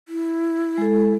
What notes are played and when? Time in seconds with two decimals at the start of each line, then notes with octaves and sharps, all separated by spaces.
0.08 E4
0.78 G#3 A4